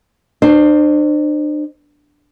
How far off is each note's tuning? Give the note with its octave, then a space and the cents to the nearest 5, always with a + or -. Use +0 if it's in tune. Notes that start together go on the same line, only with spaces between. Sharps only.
D4 +40 C5 +0